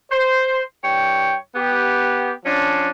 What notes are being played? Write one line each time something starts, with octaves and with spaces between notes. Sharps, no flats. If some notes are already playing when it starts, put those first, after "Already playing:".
C5
G2 C#5 G5
B3 G4
F3 C#4 D4